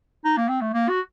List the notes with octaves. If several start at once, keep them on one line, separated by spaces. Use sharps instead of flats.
D#4
A#3
C4
A3
A#3
F#4